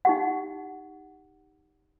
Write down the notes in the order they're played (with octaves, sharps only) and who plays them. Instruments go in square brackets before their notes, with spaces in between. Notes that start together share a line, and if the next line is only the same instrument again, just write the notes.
[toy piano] D#4 G4 F#5